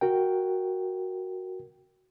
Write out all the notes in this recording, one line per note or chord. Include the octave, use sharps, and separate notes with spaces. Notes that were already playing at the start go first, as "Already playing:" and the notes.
F#4 A#4 G5